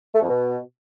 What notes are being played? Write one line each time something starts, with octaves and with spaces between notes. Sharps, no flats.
A3
F2
B2